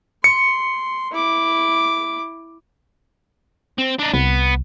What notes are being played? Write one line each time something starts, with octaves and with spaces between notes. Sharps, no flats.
C6 C#7
E4 D6
C4
D4 D#4
C2 B3